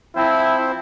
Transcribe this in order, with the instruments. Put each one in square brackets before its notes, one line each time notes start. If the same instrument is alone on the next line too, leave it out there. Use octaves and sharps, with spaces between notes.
[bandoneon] F3 C4 C5 [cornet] E4